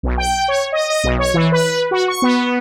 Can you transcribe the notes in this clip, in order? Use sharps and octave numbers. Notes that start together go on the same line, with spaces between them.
B1
G5
C#5
D#5
D#5
B1
C#5
E3
B4
F#4
C#6
B3